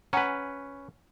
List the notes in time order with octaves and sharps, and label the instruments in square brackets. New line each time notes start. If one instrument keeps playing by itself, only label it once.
[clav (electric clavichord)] C#4 B4 [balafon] F#5 G#5 A#5